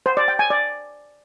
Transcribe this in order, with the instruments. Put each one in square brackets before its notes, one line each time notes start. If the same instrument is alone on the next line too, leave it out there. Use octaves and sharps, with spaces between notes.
[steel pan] C5
D5
G5
G#5
D5